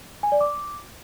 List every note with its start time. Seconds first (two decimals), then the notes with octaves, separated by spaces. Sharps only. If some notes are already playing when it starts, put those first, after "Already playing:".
0.23 G#5
0.32 D5
0.41 D6